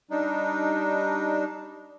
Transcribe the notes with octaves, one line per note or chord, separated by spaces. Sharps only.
G3 D4 D#4